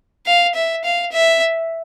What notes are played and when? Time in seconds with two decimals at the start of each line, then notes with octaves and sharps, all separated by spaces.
0.26 F5
0.55 E5
0.84 F5
1.12 E5